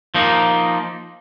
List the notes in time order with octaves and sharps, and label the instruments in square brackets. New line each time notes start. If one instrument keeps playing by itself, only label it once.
[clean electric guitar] F3 A#3 D#4